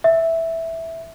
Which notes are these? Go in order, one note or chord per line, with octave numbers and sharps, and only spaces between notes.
E5